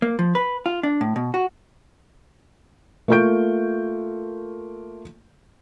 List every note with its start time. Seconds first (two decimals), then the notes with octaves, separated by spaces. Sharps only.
0.02 A#3
0.19 F3
0.35 B4
0.66 F4
0.83 D4
1.01 A2
1.16 B2
1.34 F#4
3.08 A3 A#3 F4 C#6 G6 D7